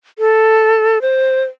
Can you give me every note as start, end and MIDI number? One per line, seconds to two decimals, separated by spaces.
0.19 1.01 69
1.02 1.43 72